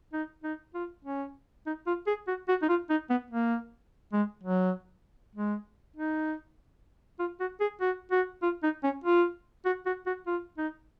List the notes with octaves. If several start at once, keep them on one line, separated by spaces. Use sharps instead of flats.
D#4
D#4
F4
C#4
D#4
F4
G#4
F#4
F#4
D#4
F4
D#4
B3
A#3
G#3
F#3
G#3
D#4
F4
F#4
G#4
F#4
F#4
F4
D#4
C#4
F4
F#4
F#4
F#4
F4
D#4